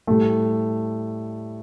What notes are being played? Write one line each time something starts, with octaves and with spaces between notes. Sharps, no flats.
A2 G3 A3